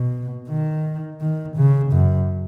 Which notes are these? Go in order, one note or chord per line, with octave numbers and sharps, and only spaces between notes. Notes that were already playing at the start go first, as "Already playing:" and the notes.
Already playing: B2
D#3
D#3
C#3
F#2